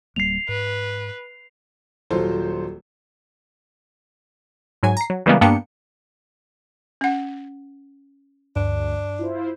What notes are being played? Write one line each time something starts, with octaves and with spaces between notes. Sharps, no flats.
D1 G3 A#3 C7 F7
G#2 B4
D#1 F#3 F4 A4 C5
G#2 F#3 G#5
A#5 C7
F#3
C#3 E3 G3 G#3 A#3 B3
G2 A#3 B3 D4 G5 C#7
C#4 F#5
D2 G2 D4
E4 F4 C5